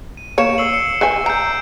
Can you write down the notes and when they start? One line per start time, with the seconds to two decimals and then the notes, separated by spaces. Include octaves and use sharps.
0.17 D#7
0.38 A#3 C#5 C#7 D7 E7
0.58 E6 C7 F#7
0.74 C#7
1.01 B4 E5 G#5
1.26 A#5 G6 C7 D7